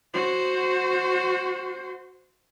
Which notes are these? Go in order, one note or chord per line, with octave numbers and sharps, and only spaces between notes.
F#4 C5